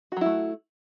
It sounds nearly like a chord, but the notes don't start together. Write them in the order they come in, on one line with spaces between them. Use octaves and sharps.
F#4 F#3 E4 A3